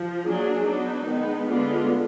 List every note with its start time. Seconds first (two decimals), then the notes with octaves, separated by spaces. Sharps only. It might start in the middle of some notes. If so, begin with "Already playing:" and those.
Already playing: F3
0.26 F#3 A#3 D4 G#4
0.66 F#3 B3 D4 D#4
1.06 D#3 G#3 B3
1.48 D3 G#3 B3 D4 F4